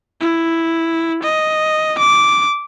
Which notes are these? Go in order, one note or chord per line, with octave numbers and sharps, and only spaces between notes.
E4
D#5
D6